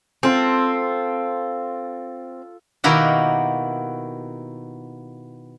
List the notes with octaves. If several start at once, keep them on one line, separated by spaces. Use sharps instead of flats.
C4 F4 A4
B2 D#3 A#3 E4 F#4 G4